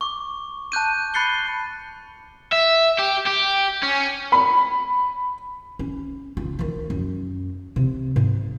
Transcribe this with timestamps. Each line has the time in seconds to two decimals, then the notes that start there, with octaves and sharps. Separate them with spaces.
0.01 C#6 D6
0.72 A5 F#6 G6 D#7
1.14 B5 F#6 A6 C7 C#7 G7
2.52 E5
2.99 G4
3.26 G4
3.83 C#4
4.32 B5
5.79 C#4
6.37 C#2 F4
6.59 D2 D#3
6.90 F#2
7.76 C3
8.16 G#2